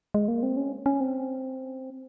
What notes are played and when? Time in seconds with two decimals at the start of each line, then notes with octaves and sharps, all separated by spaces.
0.14 G#3
0.28 A#3
0.43 C4
0.57 C#4
0.86 C#4
1.01 C4